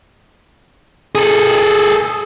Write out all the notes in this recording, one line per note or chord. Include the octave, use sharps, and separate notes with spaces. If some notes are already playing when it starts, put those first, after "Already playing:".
G#4 A4